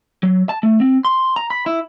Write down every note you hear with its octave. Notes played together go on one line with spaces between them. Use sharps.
F#3
A5
A3
C4
C6
A#5
B5
E4